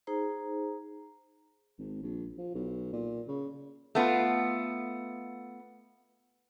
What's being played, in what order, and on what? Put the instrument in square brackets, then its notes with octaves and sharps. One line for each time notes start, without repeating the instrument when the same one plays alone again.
[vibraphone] D#4 G#4 C5 A#5
[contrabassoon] G#1
A#1
F3
B1
A#2
C#3
[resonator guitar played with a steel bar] A3 B3 F4